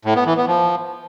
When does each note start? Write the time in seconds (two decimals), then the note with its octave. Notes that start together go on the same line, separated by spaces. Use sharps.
0.05 A2
0.16 B3
0.26 E3
0.37 B3
0.47 F3